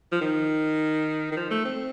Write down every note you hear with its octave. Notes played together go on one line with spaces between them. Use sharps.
F3
D#3
D#3
F3
A3
C4